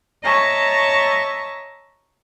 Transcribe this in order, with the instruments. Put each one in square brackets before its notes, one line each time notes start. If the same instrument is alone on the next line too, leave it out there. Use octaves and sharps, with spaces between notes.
[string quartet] C#5 D#5 E5 A5 A#5 C#6